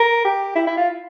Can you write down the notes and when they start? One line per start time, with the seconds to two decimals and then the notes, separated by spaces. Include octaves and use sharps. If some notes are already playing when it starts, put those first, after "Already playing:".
Already playing: A#4
0.25 G4
0.56 E4
0.67 E4
0.77 F4